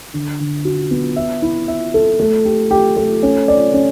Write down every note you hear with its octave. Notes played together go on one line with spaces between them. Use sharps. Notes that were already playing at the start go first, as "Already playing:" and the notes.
D3
D3
F#4
B3
E5
E4
E5
A4
A3
G4
G4
A3
C#4
D5
C#4